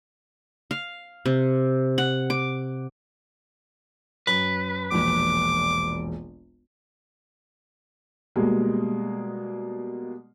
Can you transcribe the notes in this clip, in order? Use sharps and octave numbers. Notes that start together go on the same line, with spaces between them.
F5
C3
F#5
D6
F#2 B4
E1 A#1 D6
B2 G3 G#3 A#3